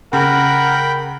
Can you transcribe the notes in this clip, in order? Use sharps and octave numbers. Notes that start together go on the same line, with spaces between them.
C#3 A#4 F#5 G5 B5